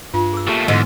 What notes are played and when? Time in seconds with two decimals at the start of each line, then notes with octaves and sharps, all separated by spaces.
0.14 G2 F4
0.33 G#4 E6
0.47 A#2 A3 G4
0.68 E2 G#2 D3 G#3 D#5